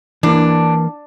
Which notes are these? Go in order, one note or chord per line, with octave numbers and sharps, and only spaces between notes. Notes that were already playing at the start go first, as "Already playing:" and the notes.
E3 A#3 D4